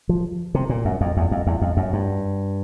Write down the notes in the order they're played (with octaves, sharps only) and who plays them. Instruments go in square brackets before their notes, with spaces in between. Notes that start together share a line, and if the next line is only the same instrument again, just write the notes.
[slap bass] F3
C3
A#2
F#2
F2
E2
F2
E2
F2
F#2
G2